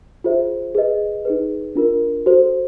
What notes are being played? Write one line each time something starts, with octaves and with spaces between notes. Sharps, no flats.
F4 G#4 C5 E5
G#4 B4 D#5
D#4 G#4 B4
D4 F4 A#4
F#4 A4 C5